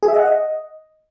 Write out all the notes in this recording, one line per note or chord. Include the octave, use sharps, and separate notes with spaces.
G#4
E5
D#5
F#5
D#5